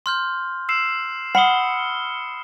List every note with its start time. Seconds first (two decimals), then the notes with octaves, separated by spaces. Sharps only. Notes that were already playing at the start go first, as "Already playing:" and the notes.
0.06 C6 F6 G6
0.69 E6 C7 E7
1.35 F#5 B5 D#6 F6 C#7 G7